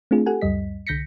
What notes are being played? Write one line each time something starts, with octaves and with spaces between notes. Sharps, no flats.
A3 C4 D4 F4 G#4
G4 A4 F#5 G#5
C#2 F#2 G3 D#5 B6
C2 D3 G6 A#6 B6 C#7